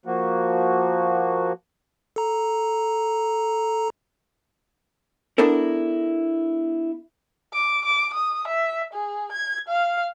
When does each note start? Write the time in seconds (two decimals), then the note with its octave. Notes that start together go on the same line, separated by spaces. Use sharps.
0.06 F3 A#3 F#4
2.16 A4 A#5
5.38 B3 D4 E4 A4 A#4
7.54 D6
7.85 D6
8.14 D#6
8.48 E5
8.93 G#4
9.32 G#6
9.69 F5